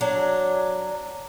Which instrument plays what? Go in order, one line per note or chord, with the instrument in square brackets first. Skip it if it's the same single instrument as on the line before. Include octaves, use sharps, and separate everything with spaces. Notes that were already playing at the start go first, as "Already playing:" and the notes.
[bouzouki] F#3 D4